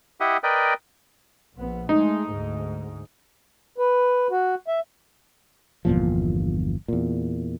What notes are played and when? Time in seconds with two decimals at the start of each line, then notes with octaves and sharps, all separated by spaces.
0.20 E4 G4 D#5 E5 F#5
0.43 A#4 B4 D5 D#5 G5
1.56 A#1 B3
1.89 G#3 A3 D#4
2.28 D2 G#2
3.78 B4
4.31 F#4
4.68 E5
5.85 G1 E2 A#2 F3
6.88 E2 A#2